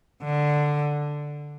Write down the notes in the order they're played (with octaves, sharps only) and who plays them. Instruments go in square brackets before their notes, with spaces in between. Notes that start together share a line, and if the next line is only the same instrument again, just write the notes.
[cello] D3